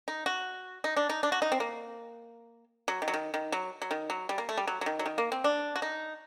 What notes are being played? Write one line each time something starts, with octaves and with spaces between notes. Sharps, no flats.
D#4
F#4
D#4
D4
D#4
D4
F#4
D#4
C4
A#3
F#3
D#3
F#3
D#3
D#3
F#3
F#3
D#3
F#3
G3
A#3
A3
G3
F#3
F#3
D#3
F#3
D#3
A#3
C4
D4
F#4
D#4